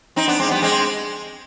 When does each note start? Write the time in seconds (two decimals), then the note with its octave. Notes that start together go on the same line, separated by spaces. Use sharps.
0.16 C4 D#4
0.28 B3 D4
0.39 G#3 C4
0.50 G3 B3
0.62 G#3 C4